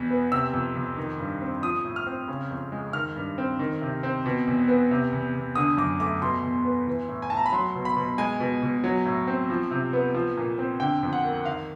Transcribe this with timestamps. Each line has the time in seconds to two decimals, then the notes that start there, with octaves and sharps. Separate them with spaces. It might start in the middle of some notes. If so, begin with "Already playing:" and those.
Already playing: E2 B2
0.10 B3
0.32 C3 E6
0.53 F2
0.76 F2
0.97 D#3
1.19 G2
1.42 C4
1.62 F3 D#6
1.85 A2
1.96 F6
2.07 C4
2.28 C#3
2.51 F2
2.72 G#3
2.93 D#3 F6
3.16 G2
3.38 C4
3.59 D#3
3.81 C3
4.03 C4
4.26 B2
4.47 E2
4.68 B3
4.91 C3
5.13 E2
5.35 E2
5.55 D3 D#6
5.77 F#2 D6
6.00 A3 D6
6.22 B2 C6
6.43 E2
6.65 B3
6.87 E3
7.08 A2
7.22 G#5
7.30 A2 A5
7.37 A#5
7.46 B5
7.52 F#3 C6
7.75 B2
7.85 B5
7.96 B2
8.18 G#3 G#5
8.40 B2
8.63 B2
8.84 F#3
9.05 A2
9.27 C4
9.50 F3
9.71 C3
9.93 B3
10.14 F3
10.37 A#2
10.58 C4
10.80 D3 G5
11.03 F2
11.13 F#5
11.24 A#3
11.45 D#3 F5